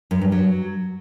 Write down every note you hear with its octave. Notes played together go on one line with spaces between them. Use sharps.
F#2
G2
F#3